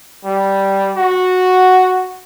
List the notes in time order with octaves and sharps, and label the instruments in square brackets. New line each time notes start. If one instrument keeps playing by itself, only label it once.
[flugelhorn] G3
F#4